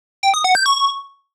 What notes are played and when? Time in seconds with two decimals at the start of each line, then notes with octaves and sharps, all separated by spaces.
0.23 G5
0.34 D#6
0.44 F#5
0.55 G6
0.66 C#6